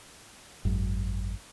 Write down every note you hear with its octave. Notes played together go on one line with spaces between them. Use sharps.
G#1 F#2